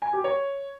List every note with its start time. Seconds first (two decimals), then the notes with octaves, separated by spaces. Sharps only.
0.02 G#5
0.13 G4
0.24 C#5